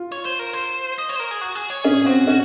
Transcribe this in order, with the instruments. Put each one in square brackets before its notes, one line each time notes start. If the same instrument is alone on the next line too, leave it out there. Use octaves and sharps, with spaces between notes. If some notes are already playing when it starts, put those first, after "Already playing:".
Already playing: [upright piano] F4
[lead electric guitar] C#5
C5
A#4
C5
D#5
C#5
C5
A#4
G#4
F#4
G#4
C#5
[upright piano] C#4 [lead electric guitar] G#4
[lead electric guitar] G#4
[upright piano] C4 [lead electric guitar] F#4
[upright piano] C#4